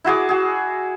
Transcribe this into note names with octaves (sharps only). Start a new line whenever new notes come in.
E4 F#4 G#4 D6
F#4 G#4